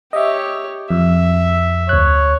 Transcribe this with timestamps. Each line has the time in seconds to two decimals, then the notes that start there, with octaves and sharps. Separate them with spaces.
0.13 G4 C#5 D#5 E5
0.90 F2 E5
1.89 D2 C#5 F#6